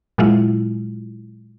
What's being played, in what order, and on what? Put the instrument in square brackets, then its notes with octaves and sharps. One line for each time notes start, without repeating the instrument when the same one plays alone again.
[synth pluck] A#2 F#3 G#3 E4 F4